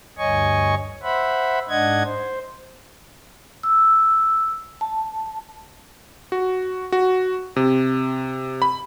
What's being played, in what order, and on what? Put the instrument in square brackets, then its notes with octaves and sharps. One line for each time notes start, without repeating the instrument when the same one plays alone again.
[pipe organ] D2 G2 C#5 D#5 G#5 C#6
C5 E5 F#5 B5
G#2 D4 D#5 F#5 G#6
C5
[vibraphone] E6
A5
[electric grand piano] F#4
F#4
C3
B5